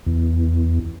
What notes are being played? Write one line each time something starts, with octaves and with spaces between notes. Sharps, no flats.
E2